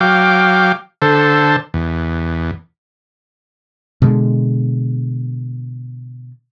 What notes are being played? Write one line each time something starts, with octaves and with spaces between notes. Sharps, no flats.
F#3 F5 G5 D6
D3 A4 C5
E2
B2 D3 G#3